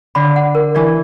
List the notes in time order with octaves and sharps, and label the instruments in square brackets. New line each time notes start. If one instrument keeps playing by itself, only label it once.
[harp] D3 [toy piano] B5
[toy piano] F#5
A#4
[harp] E3 [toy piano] D5